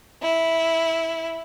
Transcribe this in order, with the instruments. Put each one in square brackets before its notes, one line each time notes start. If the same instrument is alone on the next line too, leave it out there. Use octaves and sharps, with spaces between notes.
[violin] E4